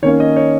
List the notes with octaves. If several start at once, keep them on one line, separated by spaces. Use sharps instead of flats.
D#3 A#3 C#4 C#5
D#5
C#5